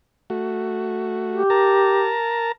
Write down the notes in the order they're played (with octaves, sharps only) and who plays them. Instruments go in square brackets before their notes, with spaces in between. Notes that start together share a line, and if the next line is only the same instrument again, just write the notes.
[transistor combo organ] A3 F#4
[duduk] G4
[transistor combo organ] A#4 A5 A#5